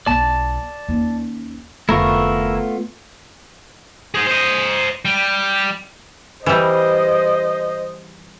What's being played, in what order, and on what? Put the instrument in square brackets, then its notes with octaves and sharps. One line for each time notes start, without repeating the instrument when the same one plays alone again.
[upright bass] B1 B3 [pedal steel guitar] D5 A5
[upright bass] D#2 C#4
[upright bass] F1 D3 [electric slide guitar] A3 B3 F4 [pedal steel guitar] E4 A#4 C#6
[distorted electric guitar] G#4 C5
C5 D#5
G3
[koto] E3 G3 [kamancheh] C5 D#5